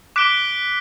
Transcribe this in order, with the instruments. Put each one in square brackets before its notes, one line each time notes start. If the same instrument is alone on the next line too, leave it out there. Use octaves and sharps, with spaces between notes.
[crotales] D6 F#6 B6 D7 G7